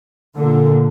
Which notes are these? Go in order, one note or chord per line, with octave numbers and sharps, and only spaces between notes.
A#2 D3